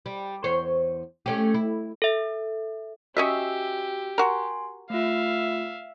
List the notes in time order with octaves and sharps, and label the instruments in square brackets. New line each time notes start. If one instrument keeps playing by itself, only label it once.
[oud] G3
E2 C5 C#5
A3 C#4 G4
E4
[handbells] A4 E5
[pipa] C#4 D#5 E5 [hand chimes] F#4 E6 [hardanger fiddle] G4
[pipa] F#4 A#4 [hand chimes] G#5 C6
[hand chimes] A3 F4 [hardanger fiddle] E5 F5